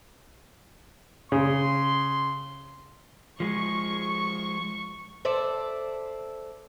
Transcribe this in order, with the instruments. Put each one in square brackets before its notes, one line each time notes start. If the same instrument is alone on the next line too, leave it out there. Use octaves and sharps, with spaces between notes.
[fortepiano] C#3 [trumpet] C6
[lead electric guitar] F3 G#3 [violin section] C#6
[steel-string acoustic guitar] A4 C5 D5 E5